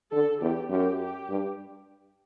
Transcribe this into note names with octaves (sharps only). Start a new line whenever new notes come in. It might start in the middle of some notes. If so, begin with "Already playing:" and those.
D3 A4
E2 G4
F#2 G4
G4
G2